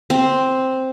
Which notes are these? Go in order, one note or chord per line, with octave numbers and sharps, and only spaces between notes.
C4